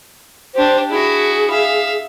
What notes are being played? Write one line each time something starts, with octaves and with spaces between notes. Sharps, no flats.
D4 G4 C5
E4 F#4 G#4
E5 F5